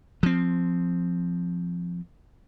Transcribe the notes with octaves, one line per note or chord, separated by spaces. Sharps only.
F3 C4